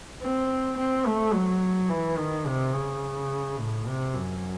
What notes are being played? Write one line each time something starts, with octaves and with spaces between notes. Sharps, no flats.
C4
C4
A3
F#3
E3
D#3
C3
C#3
A2
C3
F#2